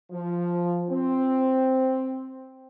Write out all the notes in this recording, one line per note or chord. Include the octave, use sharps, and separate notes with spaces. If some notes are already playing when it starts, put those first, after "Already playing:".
F3
C4